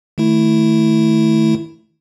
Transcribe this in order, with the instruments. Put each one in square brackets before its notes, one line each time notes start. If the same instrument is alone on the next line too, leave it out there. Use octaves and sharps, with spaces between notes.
[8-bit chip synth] D#3 A3 E4